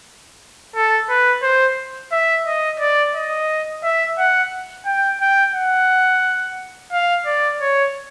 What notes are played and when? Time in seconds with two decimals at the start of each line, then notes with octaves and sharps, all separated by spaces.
0.75 A4
1.10 B4
1.43 C5
2.12 E5
2.47 D#5
2.80 D5
3.15 D#5
3.83 E5
4.18 F#5
4.86 G5
5.21 G5
5.54 F#5
6.92 F5
7.26 D5
7.61 C#5